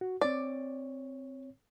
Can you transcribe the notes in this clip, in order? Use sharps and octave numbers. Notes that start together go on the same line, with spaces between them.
F#4
C4 C#5 D5